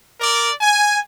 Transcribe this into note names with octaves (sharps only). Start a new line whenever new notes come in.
A#4 D5
G#5